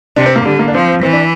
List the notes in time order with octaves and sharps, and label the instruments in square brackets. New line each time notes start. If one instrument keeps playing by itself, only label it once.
[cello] C3 [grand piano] D4
[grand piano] C4
A#3
[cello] D3 [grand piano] G3
[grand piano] A#3
D4
[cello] F3 [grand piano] C4
[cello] E3 [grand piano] C4
[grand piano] D4